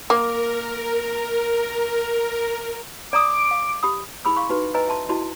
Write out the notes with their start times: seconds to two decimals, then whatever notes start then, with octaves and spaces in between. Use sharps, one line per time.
0.10 A#3 A#4
3.13 D5 A#5 D6 D#6
3.51 F5
3.83 G4 B5 D#6
4.25 E4 G#4 B5 D#6 E6
4.37 F5 C6 C#6
4.49 D#4 F#4 B4 C6
4.74 B4 D#5 G#5 A#5 E6
4.88 E5 A5 C6
5.09 E4 F#4 D#5 A5 C6